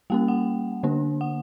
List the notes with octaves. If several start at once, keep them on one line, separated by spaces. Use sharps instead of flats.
G3 A#3 C#4 G5
F#5
D3 A#3 D4
F#5